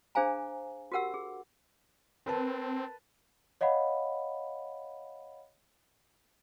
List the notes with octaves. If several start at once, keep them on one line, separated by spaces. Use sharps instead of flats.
D4 G#4 C5 F5 G#5 A#5
F#4 G4 A#4 F#5 E6
G#4
C4 A#4 B4 A5
C#5 D#5 F5 F#5 B5